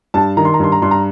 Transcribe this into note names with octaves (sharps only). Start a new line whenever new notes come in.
G2 A5
D#3 A#5
C6
A#5
G2 C6
A#5
G2 C6
A#5